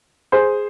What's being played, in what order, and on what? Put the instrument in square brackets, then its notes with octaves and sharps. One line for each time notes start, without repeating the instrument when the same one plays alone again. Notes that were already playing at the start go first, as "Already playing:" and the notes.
[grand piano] G#4 C5